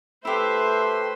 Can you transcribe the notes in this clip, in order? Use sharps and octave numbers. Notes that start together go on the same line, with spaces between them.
A3 E4 G4 B4 C5 E5 C6